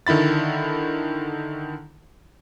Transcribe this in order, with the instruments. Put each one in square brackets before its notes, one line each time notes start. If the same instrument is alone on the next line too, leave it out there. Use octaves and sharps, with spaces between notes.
[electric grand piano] D3 D#3 E4 B5 A6